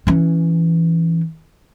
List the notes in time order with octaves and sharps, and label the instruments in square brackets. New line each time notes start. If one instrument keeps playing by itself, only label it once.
[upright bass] E3 C#4